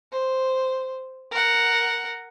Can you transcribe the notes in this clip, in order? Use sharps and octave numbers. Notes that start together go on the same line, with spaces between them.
C5
A#4 F#5